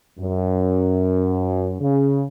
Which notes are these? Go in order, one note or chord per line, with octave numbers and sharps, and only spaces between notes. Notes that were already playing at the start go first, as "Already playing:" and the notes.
F#2
C#3